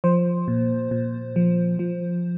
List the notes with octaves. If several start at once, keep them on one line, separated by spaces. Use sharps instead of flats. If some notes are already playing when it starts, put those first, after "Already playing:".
F3 C5
A#2
A#2
F3
F3